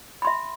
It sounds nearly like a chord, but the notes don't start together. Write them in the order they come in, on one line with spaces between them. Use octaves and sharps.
B5 C6 E5